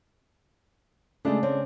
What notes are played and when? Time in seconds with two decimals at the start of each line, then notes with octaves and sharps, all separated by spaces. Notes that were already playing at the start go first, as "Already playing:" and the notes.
1.25 C#3 G#3 A3 D4
1.43 C4 C#4 C#5